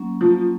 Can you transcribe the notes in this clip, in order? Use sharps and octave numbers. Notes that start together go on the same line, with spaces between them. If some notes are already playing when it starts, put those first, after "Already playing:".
Already playing: F#3 A#3 C#4
F3